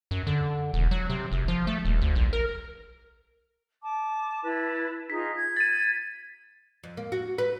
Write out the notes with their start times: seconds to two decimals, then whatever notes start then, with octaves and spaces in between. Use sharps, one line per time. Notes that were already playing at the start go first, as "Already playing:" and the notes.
0.11 F#2
0.27 D3
0.74 E1
0.91 F#3
1.10 C3
1.32 F#1
1.48 F3
1.67 A3
1.85 D#1
2.01 D2
2.15 A#1
2.33 A#4
3.83 A5 D6
4.43 E4 B4 A5
5.10 D#4 F4 G#4 B6
5.36 G#6
5.57 A6 D#7
6.84 F2
6.97 A#3
7.12 F#4
7.38 B4